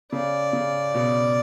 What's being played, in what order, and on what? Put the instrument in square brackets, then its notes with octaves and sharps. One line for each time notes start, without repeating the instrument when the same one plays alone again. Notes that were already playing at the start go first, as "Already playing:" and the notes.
[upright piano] C#3 [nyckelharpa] D5
[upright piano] C#3
B2